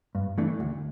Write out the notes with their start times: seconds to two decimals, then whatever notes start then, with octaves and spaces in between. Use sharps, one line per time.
0.15 G2
0.38 E3 A3 D4
0.60 D2